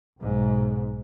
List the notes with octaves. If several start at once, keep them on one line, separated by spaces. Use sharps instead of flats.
B1 G#2